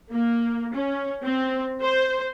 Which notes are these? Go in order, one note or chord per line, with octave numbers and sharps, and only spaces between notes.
A#3
C#4
C4
C5